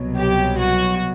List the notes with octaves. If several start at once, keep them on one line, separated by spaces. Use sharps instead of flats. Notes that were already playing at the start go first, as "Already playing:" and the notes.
Already playing: C2 B2 F#3
G4
F#4